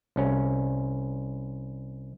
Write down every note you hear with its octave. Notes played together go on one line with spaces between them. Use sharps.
C2 C#4